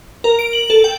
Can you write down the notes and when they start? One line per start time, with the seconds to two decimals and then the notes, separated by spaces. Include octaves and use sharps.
0.24 A#4
0.39 D7
0.53 F#7
0.70 A4
0.84 G5